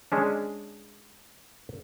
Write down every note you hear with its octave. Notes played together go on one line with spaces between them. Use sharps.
G#3 C#4 D4